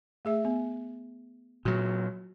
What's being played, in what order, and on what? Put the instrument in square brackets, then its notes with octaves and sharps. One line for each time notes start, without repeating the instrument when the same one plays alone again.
[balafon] A3 G#4 E5
B3
[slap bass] A#2 F#3 [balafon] F#4